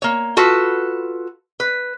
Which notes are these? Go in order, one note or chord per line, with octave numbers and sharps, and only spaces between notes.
A#3 C#5
F4 F#4 A4 B4
B4